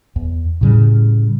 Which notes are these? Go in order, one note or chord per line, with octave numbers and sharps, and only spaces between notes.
E2
A2 C#3 G3